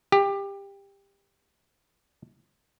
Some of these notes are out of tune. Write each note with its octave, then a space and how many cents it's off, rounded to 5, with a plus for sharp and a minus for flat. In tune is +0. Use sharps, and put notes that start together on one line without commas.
G4 +20